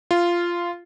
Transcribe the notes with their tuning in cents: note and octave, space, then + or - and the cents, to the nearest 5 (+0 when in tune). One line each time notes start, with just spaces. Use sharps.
F4 -10